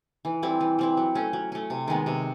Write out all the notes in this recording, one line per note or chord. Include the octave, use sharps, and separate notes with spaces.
E3
G3 C4 E4
E3
G3 C4 E4
F#3
A3 C#4
F#3
A3 C#4
C3
D#3 G#3 B3
C3